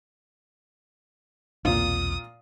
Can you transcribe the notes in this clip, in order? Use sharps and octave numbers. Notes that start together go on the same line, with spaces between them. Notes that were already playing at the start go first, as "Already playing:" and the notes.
B1 E2 A#2 C4 F4 D#6